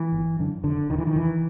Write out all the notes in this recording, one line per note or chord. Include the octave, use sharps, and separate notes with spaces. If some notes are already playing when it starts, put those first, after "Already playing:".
Already playing: E3
G1
F#2 D3
F1 D3
D#2 D3 D#3
E3
D#3
F1 E3